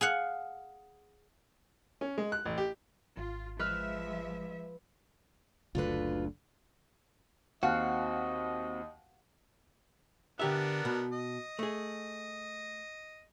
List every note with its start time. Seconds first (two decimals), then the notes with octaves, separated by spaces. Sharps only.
0.01 G#4 F5 F#5
2.01 C#4
2.18 G#3
2.32 F#6
2.45 A1
2.58 G4
3.17 G#1 F4
3.59 F3 G#3 B4 E5 F6
5.75 F#1 D2 D3 F4 B4
7.63 D#2 C4 F#4 D#5 F5 F#5
10.39 D3 B3 D4 G4 A#4 E5
10.85 B2
11.12 D#5
11.59 A3 G#4